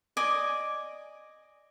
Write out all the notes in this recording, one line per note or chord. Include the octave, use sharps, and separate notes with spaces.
D5 D#5 G#5 D6